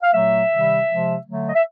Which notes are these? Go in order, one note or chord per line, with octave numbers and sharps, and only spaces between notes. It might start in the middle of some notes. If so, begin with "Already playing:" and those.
F5
A#2 F#3 A3 E5
C3 D#3 G3
C3 F3 G#3
D3 F#3 A3
D#5
E5